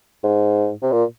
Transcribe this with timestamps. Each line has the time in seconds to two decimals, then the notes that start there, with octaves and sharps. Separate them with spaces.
0.23 G#2
0.82 C3
0.92 A#2